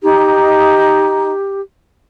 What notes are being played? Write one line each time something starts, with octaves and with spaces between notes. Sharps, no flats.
D#4 G4